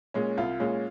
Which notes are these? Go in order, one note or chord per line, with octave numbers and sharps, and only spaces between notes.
A#2 G#3 C#4
C2 F4
A#2 G#3 C#4